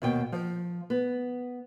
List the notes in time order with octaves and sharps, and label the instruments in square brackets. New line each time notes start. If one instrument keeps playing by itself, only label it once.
[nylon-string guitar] D#2 B2 G5
F3
B3